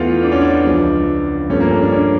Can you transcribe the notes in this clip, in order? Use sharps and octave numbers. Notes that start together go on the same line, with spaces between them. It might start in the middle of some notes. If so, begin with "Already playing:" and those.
Already playing: E2 E3 A3 F4
D4
C#4
D4
C#2 C#3 F3
G2 F3 A3 C#4
A#3
C#4
D4
C#4